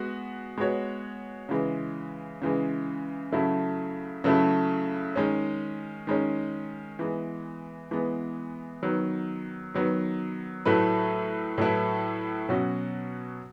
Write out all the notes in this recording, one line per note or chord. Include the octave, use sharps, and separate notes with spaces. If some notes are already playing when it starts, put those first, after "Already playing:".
Already playing: G#3 B3 F#4
G#3 B3 F#4 C#5
C#3 E3 G#3
C#3 E3 G#3
C#3 F#3 A3 E4
C#3 F#3 A3 E4
D#3 G#3 C#4
D#3 G#3 C#4
E3 G#3 B3
E3 G#3 B3
D#3 F#3 B3
D#3 F#3 B3
A2 F#3 A3 E4 B4
A2 F#3 A3 E4 B4
B2 F#3 C#4 F#4